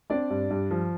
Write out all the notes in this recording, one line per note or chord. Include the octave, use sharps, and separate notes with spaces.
C4 D4 D5
G2
G2
F3